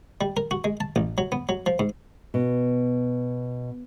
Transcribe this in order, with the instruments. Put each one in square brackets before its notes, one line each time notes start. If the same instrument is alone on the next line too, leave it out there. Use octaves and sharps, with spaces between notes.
[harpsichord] G3
A#4
F#4
G#3
A5
A1
F#3
B3
F#3
F3
G#2
[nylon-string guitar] B2